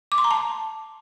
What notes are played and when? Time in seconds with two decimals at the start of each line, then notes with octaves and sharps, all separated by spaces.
0.12 D6
0.18 C6
0.24 A#5
0.31 A5